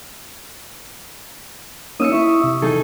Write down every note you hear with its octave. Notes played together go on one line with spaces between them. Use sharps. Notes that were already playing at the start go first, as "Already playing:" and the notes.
A#3 C#4 D#4 D#6 E6 C#7
E4 E5 C#6
C3
D#4 G#4 A4